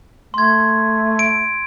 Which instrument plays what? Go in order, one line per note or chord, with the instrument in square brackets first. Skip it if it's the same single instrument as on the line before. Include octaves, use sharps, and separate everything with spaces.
[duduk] A3 [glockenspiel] C6 G#6
[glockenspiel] D7